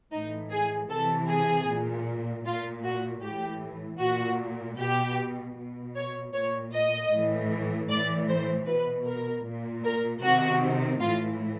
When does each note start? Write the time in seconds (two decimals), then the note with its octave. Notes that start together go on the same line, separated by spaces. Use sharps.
0.12 A2 E3 D#4
0.51 G#4
0.90 C3 E3 A4
1.29 G#4
1.68 A#2
2.46 A#2 F4
2.84 F#4
3.23 A2 E3 G4
4.00 A#2 F#4
4.78 B2 G4
5.57 B2
5.96 C#5
6.34 A#2 C#5
6.73 D#5
7.12 A2 E3
7.89 A2 E3 D5
8.28 C5
8.67 B2 B4
9.06 A#4
9.46 A#2
9.84 A#4
10.23 C3 D#3 F#4
11.00 A2 E3 F4